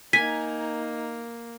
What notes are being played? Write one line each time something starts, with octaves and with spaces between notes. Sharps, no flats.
A#3 D#4 G#5 B6